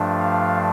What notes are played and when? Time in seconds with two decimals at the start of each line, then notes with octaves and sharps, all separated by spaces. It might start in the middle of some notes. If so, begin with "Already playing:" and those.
Already playing: G2 F3 A3 D4
0.20 F5